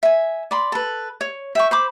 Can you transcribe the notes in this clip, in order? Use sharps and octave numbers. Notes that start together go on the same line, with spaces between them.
E5 G#5
D5 B5 C6
A4 B4
C#5
E5 G5 C#6
C5 B5 D6